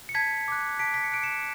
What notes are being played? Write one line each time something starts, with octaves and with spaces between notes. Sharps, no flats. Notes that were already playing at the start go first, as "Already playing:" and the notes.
C#7
A5 G#6 B6
D6 F#6
A5 B6 D7
B6
C#7
D6 F#6 D7
C#7 E7